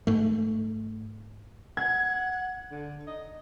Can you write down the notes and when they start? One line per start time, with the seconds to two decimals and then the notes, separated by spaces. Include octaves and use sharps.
0.07 G#2 A3
1.77 F#5 G#6
2.72 D3
3.07 D#5